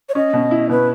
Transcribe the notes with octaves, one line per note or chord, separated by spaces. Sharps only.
C#5
C#4 D#5
B2
E4
B2 B4